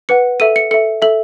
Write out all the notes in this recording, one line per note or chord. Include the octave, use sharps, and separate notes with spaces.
B4 F#5 C#7
A4 E5 D#7
C#7
A4 E5 C#7
A4 E5 F#7